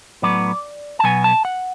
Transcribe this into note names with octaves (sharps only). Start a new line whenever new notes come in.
A2 F#3 B3 D5
A5
B2 F#3 B3 G#5
A5
F#5